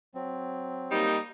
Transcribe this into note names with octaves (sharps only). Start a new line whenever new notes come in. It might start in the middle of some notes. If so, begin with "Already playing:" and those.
F#3 C4
G3 A#3 D#4